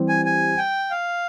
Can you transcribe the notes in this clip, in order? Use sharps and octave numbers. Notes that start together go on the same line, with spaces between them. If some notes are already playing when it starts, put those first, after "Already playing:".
Already playing: E3 G3 C4 G4
G#5
G#5
G5
F5